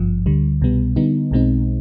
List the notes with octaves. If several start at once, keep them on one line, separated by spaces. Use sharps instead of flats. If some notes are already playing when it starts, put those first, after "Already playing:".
Already playing: G#1 G2 F3
D2 D3 G3
C2 B2 G3 B3
D3 G3 B3 D#4
B1 B2 G#3 C4 D#4